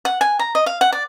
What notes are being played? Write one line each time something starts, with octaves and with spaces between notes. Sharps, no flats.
F#5
G#5
A#5
D#5
F5
F#5
D5